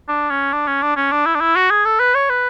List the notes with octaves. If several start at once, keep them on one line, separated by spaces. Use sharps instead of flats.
D4
C#4
D4
C#4
D4
C#4
D4
E4
D4
E4
F#4
G#4
A4
B4
C#5
B4